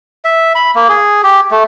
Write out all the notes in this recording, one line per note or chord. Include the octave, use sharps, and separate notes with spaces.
E5
B5
A#3
G#4
G4
A3